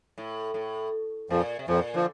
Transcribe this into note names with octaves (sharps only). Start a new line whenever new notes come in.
A2
A2
F2 A#2 F3
C3
F2 A#2 F3
D3 F3